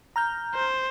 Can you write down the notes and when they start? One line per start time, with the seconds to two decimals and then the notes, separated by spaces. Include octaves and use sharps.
0.16 A#5 F6 G6
0.54 C5